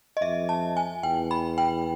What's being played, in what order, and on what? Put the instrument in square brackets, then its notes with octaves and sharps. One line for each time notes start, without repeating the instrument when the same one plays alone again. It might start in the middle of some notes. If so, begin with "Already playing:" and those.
[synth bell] D#5
[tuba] F2 [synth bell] E5
[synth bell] A5
G#5
[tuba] E2 [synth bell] G5
[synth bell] B5
G5